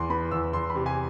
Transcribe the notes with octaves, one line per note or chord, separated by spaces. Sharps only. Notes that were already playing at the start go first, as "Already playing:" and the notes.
Already playing: E2 C6
B3 B5
E2 E6
E2 C6
B5
C3
G#5